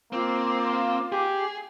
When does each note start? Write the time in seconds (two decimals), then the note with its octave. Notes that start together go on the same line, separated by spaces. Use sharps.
0.13 A#3 C4 F4 D6
1.12 G4 G#4